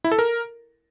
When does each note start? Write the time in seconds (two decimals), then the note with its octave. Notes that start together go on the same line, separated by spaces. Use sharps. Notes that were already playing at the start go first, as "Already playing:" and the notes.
0.04 E4
0.12 A4
0.19 A#4